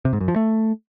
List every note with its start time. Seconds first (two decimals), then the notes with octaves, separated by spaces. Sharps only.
0.05 C3
0.13 G#2
0.20 F#2
0.28 F3
0.36 A3